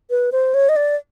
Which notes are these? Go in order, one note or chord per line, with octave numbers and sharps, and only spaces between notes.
B4
C5
C#5
D#5
D5